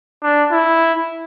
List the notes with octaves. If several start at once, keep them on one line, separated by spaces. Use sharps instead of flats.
D4
E4